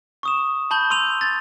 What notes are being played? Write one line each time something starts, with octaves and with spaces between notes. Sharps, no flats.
C#6 D#6 E7
A5 B5 G6 G7
C6 E6 D#7 F7
G#6 A6